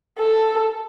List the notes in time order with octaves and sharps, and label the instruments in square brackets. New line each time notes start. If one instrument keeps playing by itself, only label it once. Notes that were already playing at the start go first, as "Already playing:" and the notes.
[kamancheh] A4